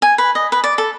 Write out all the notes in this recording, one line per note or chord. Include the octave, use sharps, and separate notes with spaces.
G#5
B4
D#5
B4
D5
A4